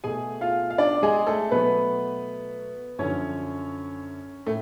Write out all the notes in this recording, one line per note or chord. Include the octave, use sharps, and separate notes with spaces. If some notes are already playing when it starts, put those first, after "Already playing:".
B2 A3 G#4 G#5
F4 F5
F5
D4 D5
G#3 G#4
A3 A4
B2 F#3 A3 B3 B4
F#2 D3 F3 C#4 C#5
A2 A3